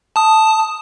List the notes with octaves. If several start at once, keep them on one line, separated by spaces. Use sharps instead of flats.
A5 D#6